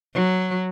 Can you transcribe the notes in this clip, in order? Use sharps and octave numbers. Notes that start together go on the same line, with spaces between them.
F#3